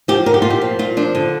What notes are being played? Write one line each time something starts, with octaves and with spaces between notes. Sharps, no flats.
F3 G4
D3 A#4
G4
A#2 F4
G4
F3
A#2 F4
F3 D4
D3